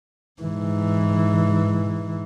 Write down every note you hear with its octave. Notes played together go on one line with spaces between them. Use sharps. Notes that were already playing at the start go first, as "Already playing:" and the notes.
G#2 E3